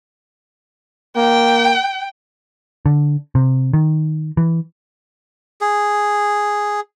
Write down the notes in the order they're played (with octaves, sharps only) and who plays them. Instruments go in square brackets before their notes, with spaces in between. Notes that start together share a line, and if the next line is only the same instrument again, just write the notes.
[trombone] A#3 [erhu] G5
[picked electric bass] D3
C3
D#3
E3
[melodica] G#4